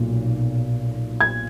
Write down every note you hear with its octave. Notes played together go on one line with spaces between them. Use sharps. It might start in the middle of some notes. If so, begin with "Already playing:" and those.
Already playing: B1 A#2
G#6